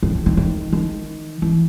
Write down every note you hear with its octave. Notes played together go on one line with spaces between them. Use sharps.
D#3
D#3
D#3
D#3
D#3
E3